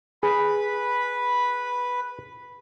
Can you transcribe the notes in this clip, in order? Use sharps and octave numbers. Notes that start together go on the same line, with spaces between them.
G#4 B4 B5